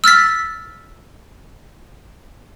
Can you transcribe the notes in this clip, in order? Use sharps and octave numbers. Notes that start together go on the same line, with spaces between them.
E6 F6 A6 B6